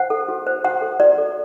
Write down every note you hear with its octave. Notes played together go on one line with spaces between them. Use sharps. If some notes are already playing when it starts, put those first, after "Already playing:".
Already playing: C5 F#5
A4
F#4
C5
F#4 F#5
A4
F#4 D5
A4